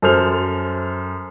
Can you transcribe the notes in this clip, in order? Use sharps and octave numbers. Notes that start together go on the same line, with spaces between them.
F#2 A4 C5 F6 F7